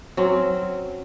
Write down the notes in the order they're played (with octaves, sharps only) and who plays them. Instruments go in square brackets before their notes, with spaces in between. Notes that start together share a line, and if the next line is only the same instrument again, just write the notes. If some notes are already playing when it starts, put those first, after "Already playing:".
[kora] F#3 C4 C#4